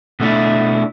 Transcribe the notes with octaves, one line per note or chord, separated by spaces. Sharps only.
B2 A3 D4 E4